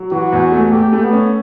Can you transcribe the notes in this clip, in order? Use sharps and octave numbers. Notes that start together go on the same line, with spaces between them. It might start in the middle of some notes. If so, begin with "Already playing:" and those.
Already playing: F#3
E3 F#4
E2
A3
A3 G4
A3
B3
C#4